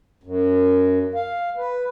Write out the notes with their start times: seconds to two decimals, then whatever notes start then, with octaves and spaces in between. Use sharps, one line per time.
0.23 F#2
1.15 F5
1.57 B4